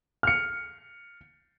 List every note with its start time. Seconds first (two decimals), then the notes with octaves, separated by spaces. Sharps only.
0.23 F6 C#7